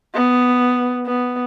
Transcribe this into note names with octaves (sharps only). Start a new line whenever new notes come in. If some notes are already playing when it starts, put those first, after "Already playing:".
B3
B3